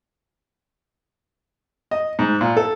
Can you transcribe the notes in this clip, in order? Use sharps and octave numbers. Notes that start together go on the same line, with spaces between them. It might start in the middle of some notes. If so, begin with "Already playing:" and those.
D#5
G#2
A#2
A4